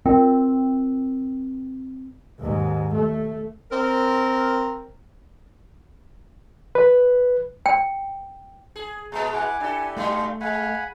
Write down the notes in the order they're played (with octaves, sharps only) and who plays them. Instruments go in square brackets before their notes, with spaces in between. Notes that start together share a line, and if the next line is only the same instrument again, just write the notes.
[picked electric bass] C4 [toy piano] F4 A#4 G5
[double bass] D#2 G#2
A3
[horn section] C4 A#4
[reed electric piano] B4
[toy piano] G5
[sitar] G#4
[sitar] A#2 G#3 B3 [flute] A#5
[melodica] E4 F#5 D6 [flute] G#5
[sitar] D4 A4 [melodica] E4 G4
[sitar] A#2 G3 D#4 [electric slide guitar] A3 [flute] F5
[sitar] G#3 [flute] F5 [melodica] F#5 G#5 B5